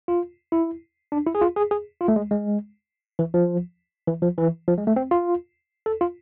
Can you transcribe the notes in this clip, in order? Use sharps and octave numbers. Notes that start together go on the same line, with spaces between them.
F4
E4
D4
E4
G#4
F4
G#4
G#4
F4
A3
G#3
G#3
E3
F3
E3
F3
E3
F3
G#3
A3
C4
F4
A4
F4